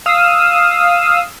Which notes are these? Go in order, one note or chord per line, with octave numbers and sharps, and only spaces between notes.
F5 D#6 E6